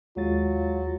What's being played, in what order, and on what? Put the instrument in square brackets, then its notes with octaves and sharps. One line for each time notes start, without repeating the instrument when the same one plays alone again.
[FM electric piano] D#2 G#3 A6 [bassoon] F#3 [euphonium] F4